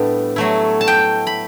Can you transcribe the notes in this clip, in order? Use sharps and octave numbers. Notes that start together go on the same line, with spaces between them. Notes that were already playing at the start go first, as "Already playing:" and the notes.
Already playing: A2 G3 B3 D4
F#3 A3 E4
A5
G5
B5